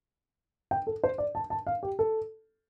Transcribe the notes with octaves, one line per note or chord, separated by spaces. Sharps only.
G5
A4
C5
D5
A5
A5
F5
G4
A4